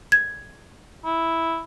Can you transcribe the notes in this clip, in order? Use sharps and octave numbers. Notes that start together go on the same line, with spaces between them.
G#6
E4